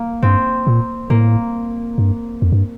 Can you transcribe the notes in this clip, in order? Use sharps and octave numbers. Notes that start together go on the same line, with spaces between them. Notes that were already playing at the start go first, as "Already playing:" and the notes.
Already playing: A#3
G2 C4
A#2
A2 A#3
G2
F2
G2